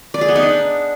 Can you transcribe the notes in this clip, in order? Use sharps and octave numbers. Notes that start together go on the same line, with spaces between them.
D5
G#4
B3
D#4
D4